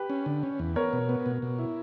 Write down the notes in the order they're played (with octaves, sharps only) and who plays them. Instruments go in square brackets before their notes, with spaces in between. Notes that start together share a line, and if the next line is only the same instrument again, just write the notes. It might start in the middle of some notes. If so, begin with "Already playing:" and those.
Already playing: [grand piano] G4 B4
[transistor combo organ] C#4
D3
C#4
E2
[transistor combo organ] B3 [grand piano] A#4 C#5
[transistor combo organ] B2
B3
B2
B2
E4